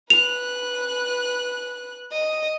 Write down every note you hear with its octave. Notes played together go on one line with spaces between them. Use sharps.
B4 F#6 F7
D#5